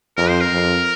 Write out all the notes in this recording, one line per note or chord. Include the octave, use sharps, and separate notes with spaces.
F2 A#4
C5
A#4
F2